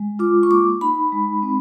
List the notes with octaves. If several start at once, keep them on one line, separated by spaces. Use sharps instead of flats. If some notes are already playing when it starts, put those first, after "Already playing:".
Already playing: G#3
F4 D6
C#6
A#3 D6
D#4 B5
G#3
C4